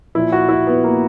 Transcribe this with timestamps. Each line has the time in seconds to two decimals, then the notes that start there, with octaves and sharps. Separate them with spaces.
0.15 A#2 F3 E4
0.32 F#4
0.49 E4
0.67 B3
0.84 A#3